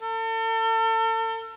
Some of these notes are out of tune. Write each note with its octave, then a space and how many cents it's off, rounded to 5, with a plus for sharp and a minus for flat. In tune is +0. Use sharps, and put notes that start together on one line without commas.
A4 +40